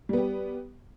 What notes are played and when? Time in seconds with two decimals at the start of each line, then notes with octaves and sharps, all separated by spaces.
0.09 G3
0.13 B3
0.17 G4